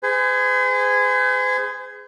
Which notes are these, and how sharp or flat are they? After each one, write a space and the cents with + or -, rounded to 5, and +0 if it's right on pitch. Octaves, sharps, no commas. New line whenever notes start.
G#4 +0 C5 -45